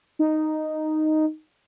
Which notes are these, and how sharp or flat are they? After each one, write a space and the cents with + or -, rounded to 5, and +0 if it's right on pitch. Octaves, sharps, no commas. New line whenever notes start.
D#4 -5